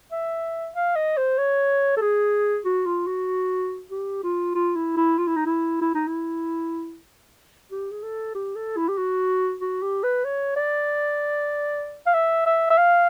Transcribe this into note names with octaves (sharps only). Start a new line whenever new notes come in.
E5
F5
D#5
C5
C#5
A4
G#4
F#4
F4
F#4
G4
F4
F4
E4
E4
F4
E4
D#4
E4
E4
D#4
E4
G4
G#4
A4
G4
A4
E4
G4
F#4
F#4
G4
B4
C#5
D5
F5
E5
E5
E5
F5